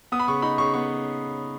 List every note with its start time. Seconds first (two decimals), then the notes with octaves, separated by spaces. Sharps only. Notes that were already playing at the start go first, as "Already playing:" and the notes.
0.12 B3 D#6
0.19 B5
0.27 C#3 C#6
0.42 D#4 B5
0.58 C#3 C#6
0.74 B3 C#6